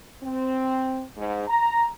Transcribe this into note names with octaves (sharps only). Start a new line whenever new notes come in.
C4
G#2
A#5